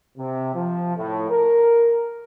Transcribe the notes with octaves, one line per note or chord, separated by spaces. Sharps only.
C3
F3
A2
A#4